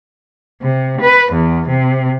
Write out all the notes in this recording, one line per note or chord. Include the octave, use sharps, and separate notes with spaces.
C3
B4
E2
C3